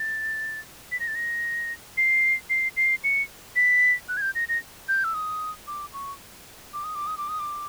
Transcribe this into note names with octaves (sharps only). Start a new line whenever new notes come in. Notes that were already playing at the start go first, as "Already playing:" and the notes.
Already playing: A6
B6
A#6
A6
A#6
C7
C7
C7
C#7
B6
F#6
G#6
G6
A#6
A#6
G6
E6
D#6
D6
C#6
D6
D#6
D6
D#6
D6
D#6
D6